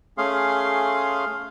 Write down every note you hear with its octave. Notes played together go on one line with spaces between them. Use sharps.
A3 C#4 G#4 F5 C6